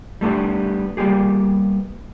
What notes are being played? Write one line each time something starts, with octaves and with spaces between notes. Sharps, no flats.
G3 A3 B3 D4 G4
G3 A#3 B3 G4 G#4